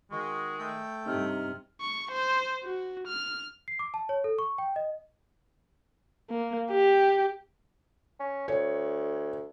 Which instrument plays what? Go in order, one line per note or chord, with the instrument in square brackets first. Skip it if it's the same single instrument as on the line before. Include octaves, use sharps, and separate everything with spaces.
[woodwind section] D#3 G#3 [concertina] F#4
[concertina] A3 A4 G5
[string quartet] G2 C3 [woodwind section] D#4 F6
[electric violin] C#6
C5
F#4
F6
[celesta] C7
D6
A5
C#5
A4
C#6
G5
D#5
[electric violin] A#3
G4
[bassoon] C#4
[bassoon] D2 [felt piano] C#5